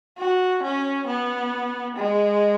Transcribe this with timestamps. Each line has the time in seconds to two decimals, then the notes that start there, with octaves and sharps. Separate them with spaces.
0.18 F#4
0.63 C#4
1.07 B3
1.96 G#3